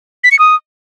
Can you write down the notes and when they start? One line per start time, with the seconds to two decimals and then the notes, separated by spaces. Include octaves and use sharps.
0.24 B6
0.31 C#7
0.39 D#6